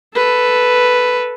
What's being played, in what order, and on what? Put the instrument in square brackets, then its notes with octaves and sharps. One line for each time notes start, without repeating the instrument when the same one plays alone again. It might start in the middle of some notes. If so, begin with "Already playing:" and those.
[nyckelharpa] A4 B4